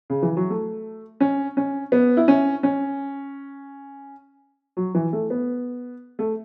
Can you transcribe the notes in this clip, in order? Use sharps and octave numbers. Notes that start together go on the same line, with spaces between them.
C#3
E3
F#3
A3
C#4
C#4
B3
E4
C#4
C#4
F#3
E3
A3
B3
A3